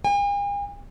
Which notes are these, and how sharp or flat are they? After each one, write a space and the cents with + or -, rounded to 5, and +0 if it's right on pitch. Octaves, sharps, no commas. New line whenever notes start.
G#5 -45